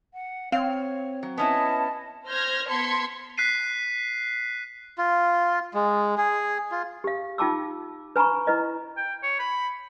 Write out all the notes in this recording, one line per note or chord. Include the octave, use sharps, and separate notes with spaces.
F#5
C4 C#5 F5
F#3
B3 C#4 E4 D#5 A5
C5 F6 G6 G#6 A#6
B3 A5 C6 G#6 B6 C#7
F#6 B6 C7 D#7
F4
G#3
G#4
F4
G4 F5
D#4 F4 G5 A5 D6 E6
B4 G#5 A#5 B5 C#6
E4 B4 D#5
G5
C#5
B5